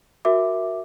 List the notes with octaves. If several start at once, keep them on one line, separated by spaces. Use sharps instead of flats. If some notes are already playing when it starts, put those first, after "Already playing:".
F#4 A#4 E5 D6